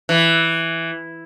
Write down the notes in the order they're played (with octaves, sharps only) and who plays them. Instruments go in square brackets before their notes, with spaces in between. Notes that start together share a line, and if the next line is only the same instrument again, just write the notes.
[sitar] E3